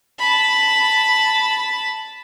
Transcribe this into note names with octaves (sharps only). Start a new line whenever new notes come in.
A5 B5